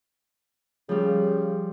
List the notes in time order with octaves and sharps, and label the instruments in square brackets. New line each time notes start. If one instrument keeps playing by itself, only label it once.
[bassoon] C#3 [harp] F3 G3